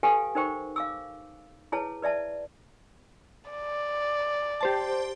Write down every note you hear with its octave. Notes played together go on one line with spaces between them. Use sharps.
G4 A4 B4 F5 G5 G#5
D#4 A#4 C5 G5 C#6
F5 D6 E6
E4 G#4 B4 C#5 A5
B4 D5 E5 A5
D5
G4 C5 A5